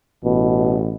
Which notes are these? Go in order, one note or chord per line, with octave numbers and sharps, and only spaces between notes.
A1 B2